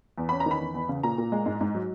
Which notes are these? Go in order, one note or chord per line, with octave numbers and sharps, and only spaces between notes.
E2
C#4 B5
A#5
D#3 B5
E2
E2
C#3
A#2 A#5
A#2
G#3
G#2
G#2
F#3